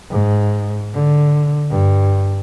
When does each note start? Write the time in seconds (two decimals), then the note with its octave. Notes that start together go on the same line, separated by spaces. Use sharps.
0.11 G#2
0.94 D3
1.71 G2